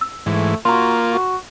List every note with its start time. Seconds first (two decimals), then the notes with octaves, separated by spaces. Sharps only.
0.01 E6
0.26 G#2 E3 A3
0.65 A#3 F4 F#4 A#5 C6
1.10 F#4